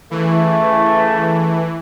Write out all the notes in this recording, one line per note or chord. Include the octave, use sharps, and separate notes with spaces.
C#3 E3 A3